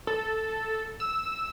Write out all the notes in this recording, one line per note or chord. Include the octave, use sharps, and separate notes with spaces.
A4
E6